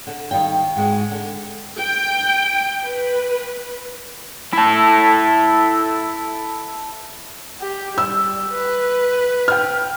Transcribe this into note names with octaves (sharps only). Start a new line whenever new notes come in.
D3
D#3 G3 F5 G5
G#2 G#3 F#4
D3
G5
B4
E4 A4
G4
G3 E6
B4
G5 F6